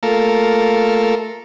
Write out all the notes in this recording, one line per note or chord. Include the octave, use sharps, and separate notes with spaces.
A3 A#3 F4 A4 A#4